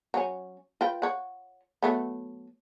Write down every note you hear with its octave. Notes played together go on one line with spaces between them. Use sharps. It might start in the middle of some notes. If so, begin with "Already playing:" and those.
F#3 C#4
F4 B4 G5
C#5 F#5
F#3 A3 B3